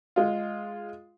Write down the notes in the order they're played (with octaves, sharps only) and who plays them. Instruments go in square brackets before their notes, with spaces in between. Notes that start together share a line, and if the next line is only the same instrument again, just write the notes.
[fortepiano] G#3 F4